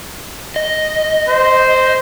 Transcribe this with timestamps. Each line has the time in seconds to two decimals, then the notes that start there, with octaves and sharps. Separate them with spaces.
0.56 D#5
1.28 C5